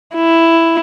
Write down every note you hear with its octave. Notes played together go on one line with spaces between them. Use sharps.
E4